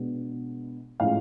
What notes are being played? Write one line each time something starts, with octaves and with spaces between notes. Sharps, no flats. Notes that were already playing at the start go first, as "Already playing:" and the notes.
Already playing: B2 G#3 B3 D4
A2 F3 G#3 C#4 F5